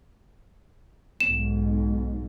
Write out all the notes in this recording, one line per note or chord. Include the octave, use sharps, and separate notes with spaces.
B1 G#2 E7